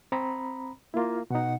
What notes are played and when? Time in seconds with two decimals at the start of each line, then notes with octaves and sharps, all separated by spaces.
0.12 C4 A#5 B5
0.94 A#3 E4 F4
1.30 B2 D#4 F#5